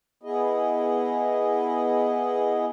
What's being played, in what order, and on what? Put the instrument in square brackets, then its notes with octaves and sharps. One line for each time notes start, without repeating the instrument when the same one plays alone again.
[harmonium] B3 E4 G#4 D#5